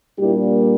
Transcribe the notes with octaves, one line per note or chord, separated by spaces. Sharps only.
A#2 G3 A#3 D4 E4 G4